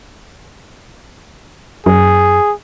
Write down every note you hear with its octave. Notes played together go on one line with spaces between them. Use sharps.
F#2 G#4